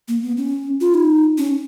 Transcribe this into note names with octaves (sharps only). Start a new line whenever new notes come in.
A#3
B3
C#4
F4
D#4
C#4